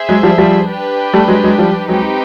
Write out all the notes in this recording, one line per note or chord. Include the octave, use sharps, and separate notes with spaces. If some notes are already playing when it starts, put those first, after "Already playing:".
Already playing: G#4 C5 E5
F#3 G#3
F3 G3
F3 G3
D4 G4 B4
G3 A3
F#3 G#3
F#3 G#3
F3 G3
F#3 G#3 C4 D#4 G4 B4